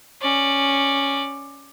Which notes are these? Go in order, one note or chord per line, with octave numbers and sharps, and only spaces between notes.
C#4 D5